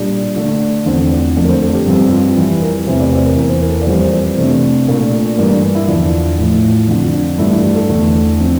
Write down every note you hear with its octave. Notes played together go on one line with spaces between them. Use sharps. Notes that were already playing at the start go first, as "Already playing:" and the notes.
Already playing: A#2 G3 D4
D3 A3 D4
E2 D3 F3 A3 C4 C5
D5
F2 D3 A3 D5
A#4
C5
A4
G4
G2 F3 C4 G4
F4
F2 E3 G3 E4
A#4
E2 C3 E3 A3 C5
D5
C5
A#4
E2 E3 A#3 A#4
C5
A#4
A4
A#4
D5
F2 E3 G3 A#3 C5
C5
C5
C5
C3 E3 A3 D4
A#2 A3 D4 A#4
A4
G2 E3 A#3 D4
D4
E4
E2 D3 F3 E4
D4
A2 F3 A3
F2 D3 F3 F4
D4
G2 E3 A3 D4 E4
E4
A4
G4
A4
E2 D3 A3
F3 C4